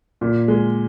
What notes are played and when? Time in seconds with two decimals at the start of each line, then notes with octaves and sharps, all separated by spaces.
0.21 A#2
0.48 G#3